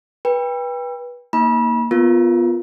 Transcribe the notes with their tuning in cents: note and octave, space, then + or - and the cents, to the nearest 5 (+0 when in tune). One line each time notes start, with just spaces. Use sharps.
B4 -20 G5 +30
A#3 +0 D#4 +30 B5 -35
B3 +0 F4 +0 A#4 +0